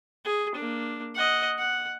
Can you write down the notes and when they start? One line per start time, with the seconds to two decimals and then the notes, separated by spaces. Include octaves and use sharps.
0.25 G#4
0.55 A#3 D4
1.15 D#5 F#5
1.58 F#5